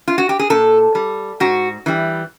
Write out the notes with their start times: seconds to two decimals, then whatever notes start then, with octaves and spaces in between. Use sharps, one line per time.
0.08 F4
0.18 F#4
0.29 G4
0.39 G#4
0.50 A#2 A4
0.95 G3
1.40 G#2 F#4
1.86 E3 G3